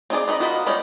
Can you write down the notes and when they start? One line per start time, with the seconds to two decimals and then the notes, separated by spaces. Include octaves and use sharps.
0.10 C4 D#4 G#4 D5
0.28 D4 D#4 B4 D#5
0.40 F4 F#4 A#4 B4 D#5
0.66 G3 G#3 B3 C#4 D#4